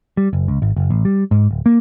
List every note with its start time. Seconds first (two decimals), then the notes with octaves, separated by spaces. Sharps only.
0.17 G3
0.33 F#1
0.48 C#2
0.62 G#1
0.76 F#1
0.90 A1
1.05 G3
1.31 G#2
1.51 D1
1.66 A#3